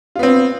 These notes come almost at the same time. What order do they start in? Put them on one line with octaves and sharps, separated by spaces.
F4 B3 C4